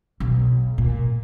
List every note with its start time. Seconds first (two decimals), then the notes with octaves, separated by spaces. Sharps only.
0.20 B1
0.78 A#2